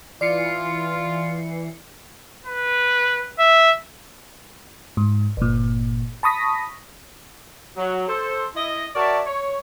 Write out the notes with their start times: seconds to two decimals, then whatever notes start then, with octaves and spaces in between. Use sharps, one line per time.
0.21 E3 F4 D5 C7 C#7
2.45 B4
3.39 E5
4.97 G#2
5.37 G1 A#2
6.23 A5 B5 C#6 D#6 A#6 B6
7.77 F#3
8.08 A4 C5
8.55 E4 D#5
8.95 F#4 A#4 C#5 D5 E5 A5
9.26 C#5